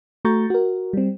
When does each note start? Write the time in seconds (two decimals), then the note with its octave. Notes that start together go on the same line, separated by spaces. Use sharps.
0.25 A3 F#4 A#5 C#6 G6 A6
0.50 F#4 A#4
0.93 G3 C4